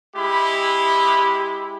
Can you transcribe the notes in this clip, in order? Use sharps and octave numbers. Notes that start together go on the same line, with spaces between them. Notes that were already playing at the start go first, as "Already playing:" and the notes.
G#3 E4 G4 B5